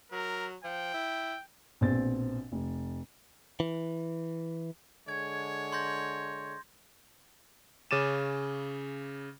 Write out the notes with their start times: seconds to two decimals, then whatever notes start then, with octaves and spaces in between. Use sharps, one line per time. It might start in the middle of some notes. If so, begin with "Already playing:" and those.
0.12 F#3 A#4
0.64 F3 G5
0.94 E4
1.81 A#1 B2 C4 A6
2.52 F1
3.60 E3
5.08 D3 G#3 C#5 G#6
5.72 C6 G6 A#6
7.91 C#3 C#4 D6 A6 D#7 E7